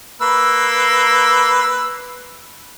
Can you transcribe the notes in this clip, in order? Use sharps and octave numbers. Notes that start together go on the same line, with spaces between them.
A#3 B4 E6